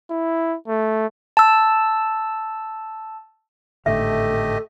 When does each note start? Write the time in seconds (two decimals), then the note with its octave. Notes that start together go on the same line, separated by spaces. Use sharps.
0.10 E4
0.68 A3
1.37 A5 E6
3.86 G#1 A2 D3 A3 G4 A4 D#5 E5